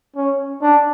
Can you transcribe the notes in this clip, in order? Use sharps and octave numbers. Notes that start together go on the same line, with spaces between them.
C#4
D4